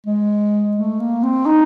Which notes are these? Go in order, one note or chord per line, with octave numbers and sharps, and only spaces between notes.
G#3
A3
A#3
C4
D#4